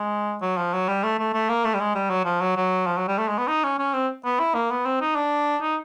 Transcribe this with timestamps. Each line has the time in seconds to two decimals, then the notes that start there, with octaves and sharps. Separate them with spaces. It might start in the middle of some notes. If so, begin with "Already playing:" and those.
Already playing: G#3
0.42 F#3
0.57 F3
0.74 F#3
0.88 G3
1.04 A3
1.19 A3
1.34 A3
1.49 A#3
1.65 A3
1.74 G3
1.80 G#3
1.95 G3
2.10 F#3
2.25 F3
2.41 F#3
2.57 F#3
2.86 F3
2.97 F#3
3.08 G3
3.18 A3
3.28 G#3
3.38 B3
3.48 D#4
3.64 C#4
3.79 C#4
3.94 C4
4.25 B3
4.40 E4
4.55 A#3
4.71 B3
4.86 C4
5.01 D#4
5.16 D4
5.62 D#4